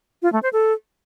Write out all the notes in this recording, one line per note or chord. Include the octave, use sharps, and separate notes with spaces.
F4
A3
C5
A4